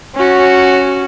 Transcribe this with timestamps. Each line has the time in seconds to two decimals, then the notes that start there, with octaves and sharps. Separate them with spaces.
0.15 C#4 F#4